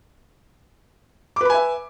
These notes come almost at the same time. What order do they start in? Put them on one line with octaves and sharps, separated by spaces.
D6 B4 B5 G#5 E5